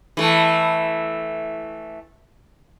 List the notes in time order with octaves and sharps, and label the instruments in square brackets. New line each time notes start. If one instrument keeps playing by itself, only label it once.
[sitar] E3 A3